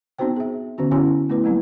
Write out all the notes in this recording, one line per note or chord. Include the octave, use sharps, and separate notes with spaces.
B3 C4 D#4 F#4 C5 G5
G#4 E5
D3 B3 C#4 F#4
C#4 E4 F#4 C#5 G#5 C6
A3 B3 E4 B4
F#3 G3 A#3 C4 E4